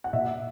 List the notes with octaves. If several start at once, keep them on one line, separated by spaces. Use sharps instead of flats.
F#5
A#2 E5